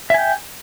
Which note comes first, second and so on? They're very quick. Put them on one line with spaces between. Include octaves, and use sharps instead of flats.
E5 G#5 G5